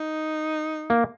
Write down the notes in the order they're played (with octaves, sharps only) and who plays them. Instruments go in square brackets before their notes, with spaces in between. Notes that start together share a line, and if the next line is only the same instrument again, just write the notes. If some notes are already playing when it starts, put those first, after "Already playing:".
Already playing: [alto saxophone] D#4
[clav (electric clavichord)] A#3